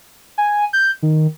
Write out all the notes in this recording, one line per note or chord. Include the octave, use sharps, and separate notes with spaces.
G#5
G6
D#3